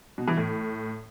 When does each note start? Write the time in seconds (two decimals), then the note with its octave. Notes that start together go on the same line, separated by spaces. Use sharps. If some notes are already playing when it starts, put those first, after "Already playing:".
0.18 B2
0.28 E3
0.37 A2